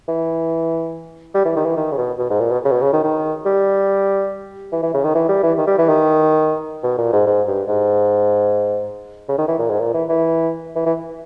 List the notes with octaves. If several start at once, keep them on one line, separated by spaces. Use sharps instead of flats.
E3
G3
E3
D#3
E3
D#3
C#3
B2
B2
G#2
A#2
B2
C#3
B2
C#3
D#3
D#3
G3
E3
E3
C#3
D#3
E3
G3
E3
D#3
G3
E3
D#3
B2
A#2
G#2
G#2
G2
G#2
C#3
D#3
E3
A#2
G#2
A#2
E3
E3
E3
E3